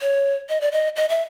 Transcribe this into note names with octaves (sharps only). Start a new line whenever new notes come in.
C#5
D#5
D5
D#5
D#5
E5